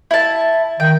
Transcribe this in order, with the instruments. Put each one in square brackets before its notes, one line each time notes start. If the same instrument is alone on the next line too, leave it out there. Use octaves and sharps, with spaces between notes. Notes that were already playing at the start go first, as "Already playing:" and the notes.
[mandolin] E4 A5
[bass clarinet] D#3 [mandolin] G5